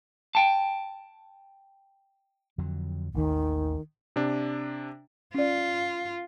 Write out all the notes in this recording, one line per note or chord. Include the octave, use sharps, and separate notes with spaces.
G5 A5
F2 D3 F#3
A1 D#2 D#3
C3 D4
C#4 F4 D5